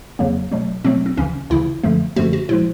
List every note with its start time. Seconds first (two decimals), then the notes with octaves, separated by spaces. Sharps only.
0.19 F2 C#3 F#3 A#3
0.52 B2 F#3 A3
0.84 B2 F#3 A3 C4
1.06 C4
1.17 D2 C#3 E3 C#4
1.50 D2 C#3 E3 E4
1.83 F#2 D3 F3 A3
2.16 F#2 D3 F3 A3 F#4
2.33 F#4
2.49 A#2 F3 G#3 E4